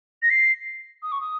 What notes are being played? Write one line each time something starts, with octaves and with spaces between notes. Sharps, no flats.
A#6
C7
D#6
C#6
D#6